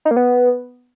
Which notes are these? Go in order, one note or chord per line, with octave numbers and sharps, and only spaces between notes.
D#4
A#3
B3